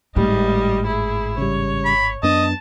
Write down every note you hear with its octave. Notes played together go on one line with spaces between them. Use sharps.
G#1 A2 G3 D#5
E4 G#4
C#3 G3 C#5
B5
F#2 B3 D4 D#5 A5